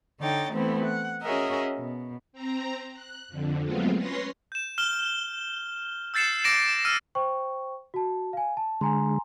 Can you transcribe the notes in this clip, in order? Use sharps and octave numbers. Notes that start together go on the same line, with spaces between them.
D3 D#4 C#5 G5 A6
E3 A3 B3 C4 E4
F#5
C#4 F#4 G#4 A#4 D#5 E5
B2
C4 A#5
F#6
F2 D3
F#3 G#3 A3 B3 C4 F4
C#4 B4 C#5 C6 A#6 C7
G6 E7
F6 E7 G7
E6 G6 A6 C7 C#7 E7
D6 A#6 D7 E7
E6 F6 D#7
C5 G5 C#6
F#4 A5
F5 G#5
A5
D3 G#3 G#5 A#5 C6